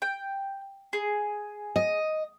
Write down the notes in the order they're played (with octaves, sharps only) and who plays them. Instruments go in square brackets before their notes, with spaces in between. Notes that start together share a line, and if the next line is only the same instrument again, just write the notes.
[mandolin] G5
G#4
[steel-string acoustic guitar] D#5